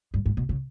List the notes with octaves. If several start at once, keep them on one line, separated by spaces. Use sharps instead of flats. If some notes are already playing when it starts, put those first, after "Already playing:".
G2
G#2
B2
C#3